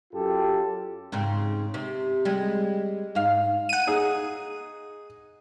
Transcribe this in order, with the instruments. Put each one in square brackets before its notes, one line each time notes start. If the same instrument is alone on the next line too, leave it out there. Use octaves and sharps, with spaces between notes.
[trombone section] F#2 F4 G4 A4
[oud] G#2 C#3 C4
C3
G3 G#3
G#2 F5
[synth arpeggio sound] F#5 D#7
[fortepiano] D#4 G#4